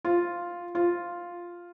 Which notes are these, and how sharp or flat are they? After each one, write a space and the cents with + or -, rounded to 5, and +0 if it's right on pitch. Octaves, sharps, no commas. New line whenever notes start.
F4 +0
F4 +0